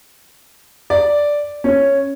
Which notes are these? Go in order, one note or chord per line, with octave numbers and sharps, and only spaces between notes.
D5
C#4